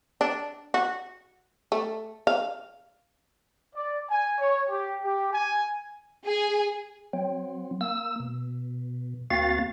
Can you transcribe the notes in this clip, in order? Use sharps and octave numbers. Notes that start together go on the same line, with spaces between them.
D4
F#4
A3
F5
D5
G#5
C#5
G4
G4
G#5
G#4
F#3 C4
A#3 E6
B2
D2 A#3 C4 F#4 F5 A6